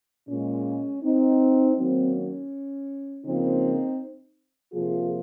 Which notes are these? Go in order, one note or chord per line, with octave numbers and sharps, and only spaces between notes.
A#2 G#3 C#4
C4 D#4
D#3 F#3 A#3 C4
C#4
C#3 F3 A#3 C4 D#4
C3 F3 A#3 F4 G#4